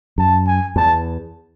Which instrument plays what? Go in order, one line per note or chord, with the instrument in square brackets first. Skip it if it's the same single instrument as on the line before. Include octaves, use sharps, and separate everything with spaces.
[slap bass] F#2 [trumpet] A5
[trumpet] G#5
[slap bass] E2 [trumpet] A5